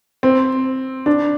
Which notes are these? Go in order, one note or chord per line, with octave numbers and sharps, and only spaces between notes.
C4
D4